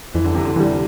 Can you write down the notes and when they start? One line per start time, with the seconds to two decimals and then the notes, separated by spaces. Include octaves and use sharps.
0.14 F2 E3
0.25 D3
0.34 C3
0.45 D3
0.56 E3 G3